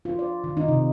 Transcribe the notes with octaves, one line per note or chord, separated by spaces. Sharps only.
F4
D5
D#3
D#4
C3